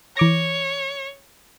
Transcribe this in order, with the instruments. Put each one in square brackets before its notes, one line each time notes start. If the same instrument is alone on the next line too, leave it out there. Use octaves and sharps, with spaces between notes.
[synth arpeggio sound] E3 D6 A#6 [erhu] C#5